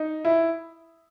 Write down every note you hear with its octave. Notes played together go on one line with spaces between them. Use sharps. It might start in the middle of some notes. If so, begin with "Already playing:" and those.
Already playing: D#4
E4